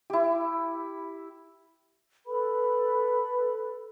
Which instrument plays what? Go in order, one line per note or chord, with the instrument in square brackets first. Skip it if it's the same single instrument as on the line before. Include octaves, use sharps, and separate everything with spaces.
[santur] E4 G4
[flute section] A4 B4 B5